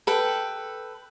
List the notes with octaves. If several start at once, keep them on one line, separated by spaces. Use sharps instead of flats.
A4 B4 G5